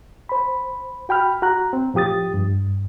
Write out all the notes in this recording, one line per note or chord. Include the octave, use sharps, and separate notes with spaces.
C5 B5
F#4 G5 B5 F6
F#4 A#5 F#6
C4
A2 F3 G4 D#6 A6
G2